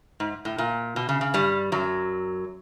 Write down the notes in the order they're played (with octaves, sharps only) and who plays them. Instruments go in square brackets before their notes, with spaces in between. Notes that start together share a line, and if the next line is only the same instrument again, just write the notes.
[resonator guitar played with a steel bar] G#2
A2
A#2
B2
C#3
C#3
G2 G3
F#2 F#3